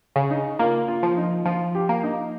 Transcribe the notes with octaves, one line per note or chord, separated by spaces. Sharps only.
C#3
D#4
A#3 F4
F4
F3
D#4
F3 F4
G4
A#3
D#4